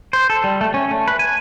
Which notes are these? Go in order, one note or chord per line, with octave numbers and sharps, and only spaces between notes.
C5
A4
G3
A3
C#4
A3
B4
G#5